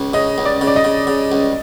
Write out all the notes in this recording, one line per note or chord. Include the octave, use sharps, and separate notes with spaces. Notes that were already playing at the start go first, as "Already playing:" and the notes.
Already playing: C#2
C#3 D#5
C#2
D5
C#3
D5
D#5
C#3
C#3
C#2